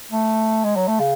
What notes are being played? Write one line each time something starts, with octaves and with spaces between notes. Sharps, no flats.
A3
G#3
F#3
A3
C#3